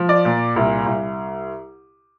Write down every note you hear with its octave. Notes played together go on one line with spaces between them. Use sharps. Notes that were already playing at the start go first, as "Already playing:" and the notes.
Already playing: F3
D5
A#2
C2
C2